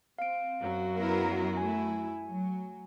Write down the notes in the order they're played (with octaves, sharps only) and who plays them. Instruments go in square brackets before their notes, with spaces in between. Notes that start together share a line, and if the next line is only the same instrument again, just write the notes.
[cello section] C4 [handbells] F5 D7
[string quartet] F#2 F#3 F#4
[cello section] B3 E4 A#4
[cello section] A3 E4 [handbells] G#5
[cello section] F#3